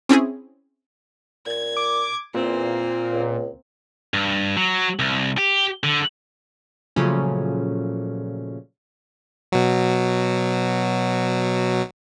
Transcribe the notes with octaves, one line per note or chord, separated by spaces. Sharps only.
C4 C#4 E4 G#4
A#2 G#6
D6
E2 A#2 A#3 C4
C#2
G2
F#3
C2
G4
D3
A#2 C#3 F3 F#3 A3 C#4
B2 F#3